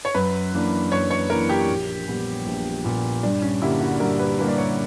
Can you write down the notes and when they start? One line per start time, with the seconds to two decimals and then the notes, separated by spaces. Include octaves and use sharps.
0.05 C#5
0.15 F#2 B4
0.53 E3 A#3 D4
0.91 F#2 C#5
1.11 C#5
1.30 E3 A#3 D4 A#4
1.49 G4
1.68 A#1
2.07 A#2 G3 B3
2.46 A#1
2.84 A#2 G3 B3
3.23 G2 D4
3.42 C#4
3.62 D3 G3 A#3 E4
3.81 F#4
4.00 G2 A#4
4.19 B4
4.39 D3 G3 A#3 B4
4.48 D5
4.58 C#5